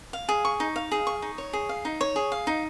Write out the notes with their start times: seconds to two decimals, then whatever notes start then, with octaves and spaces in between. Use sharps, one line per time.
0.13 F5
0.29 G#4
0.45 C#6
0.60 D#4
0.76 F5
0.92 G#4
1.07 C#6
1.22 D#4
1.38 C#5
1.53 G#4
1.69 F5
1.85 D#4
2.01 C#5
2.16 G#4
2.32 F5
2.47 D#4